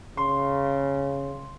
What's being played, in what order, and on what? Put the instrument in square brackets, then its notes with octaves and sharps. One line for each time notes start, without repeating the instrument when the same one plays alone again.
[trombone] C#3 [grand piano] C6